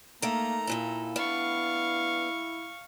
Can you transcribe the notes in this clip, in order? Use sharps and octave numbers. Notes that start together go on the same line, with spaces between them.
D#3 A3 A#3 A#5
D#2 A#2 E4 A4
B3 D4 F5 C#6